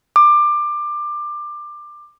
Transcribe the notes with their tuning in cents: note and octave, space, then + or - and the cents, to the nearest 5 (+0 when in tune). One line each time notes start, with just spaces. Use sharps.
D6 +20